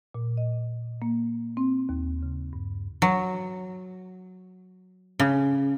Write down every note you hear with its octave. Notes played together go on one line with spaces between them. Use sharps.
A#2
D#5
A#3
C4
D#2
C#3
G2
F#3
C#3